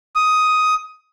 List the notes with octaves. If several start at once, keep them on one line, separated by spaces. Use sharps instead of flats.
D#6